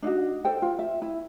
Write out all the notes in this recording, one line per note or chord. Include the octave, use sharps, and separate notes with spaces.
D4 D#4 F4 F#4
A4 C5 G5
F4
E5
E4